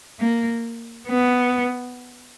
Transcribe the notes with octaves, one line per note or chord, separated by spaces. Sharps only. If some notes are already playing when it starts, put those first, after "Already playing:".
A#3
B3